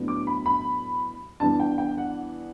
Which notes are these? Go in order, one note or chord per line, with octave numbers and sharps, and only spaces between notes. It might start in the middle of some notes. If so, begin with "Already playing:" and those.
Already playing: A2 F#3 B3 D4
D6
B5
B5
E3 G3 B3 D4 A5
G5
G5
F#5